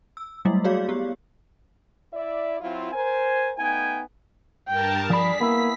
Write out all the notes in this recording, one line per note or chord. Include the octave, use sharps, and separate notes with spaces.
E6
F#3 G3 A3 A#3 E4
F#4 G#4 C#5 D5 F5
B3 G4
E4 D5 E5
F#3 C4 E4 F4
A#4 C5 G#5
A3 B3 D#4 G5 G#5
G2 A#4 G5 A5
F3 G#4 D5 B5 B6
A#3 B3 E4